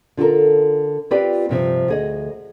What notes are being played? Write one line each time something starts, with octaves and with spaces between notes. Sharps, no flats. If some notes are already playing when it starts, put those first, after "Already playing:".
D3 F4 G4 A4 A#4
C4 F4 G4 B4 D5 G5
G2 C3 F3
D2 G#4 D#5